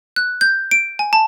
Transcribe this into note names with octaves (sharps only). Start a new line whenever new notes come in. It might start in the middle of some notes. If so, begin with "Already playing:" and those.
F#6
G6
D7
G#5
A5